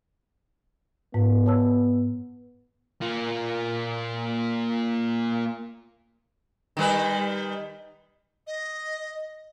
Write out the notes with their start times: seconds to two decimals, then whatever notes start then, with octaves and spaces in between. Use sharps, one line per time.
1.14 G#2 B3
1.46 C#5 A5 E6
3.02 A#3 F4
6.77 D#3 G3 B4
8.47 D#5